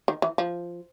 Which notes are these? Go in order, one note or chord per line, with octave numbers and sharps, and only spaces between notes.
D#3
E3
F3